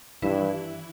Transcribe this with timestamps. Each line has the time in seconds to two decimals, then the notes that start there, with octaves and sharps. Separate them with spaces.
0.22 G2 E3 E4